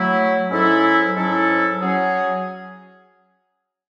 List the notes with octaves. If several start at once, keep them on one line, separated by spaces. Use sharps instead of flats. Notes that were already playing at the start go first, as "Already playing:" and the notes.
Already playing: F#3 A3 E4
G#2 F#3 C#4 E4 A4
G#2 F#3 C#4 E4 A4
F#3 C#4 G#4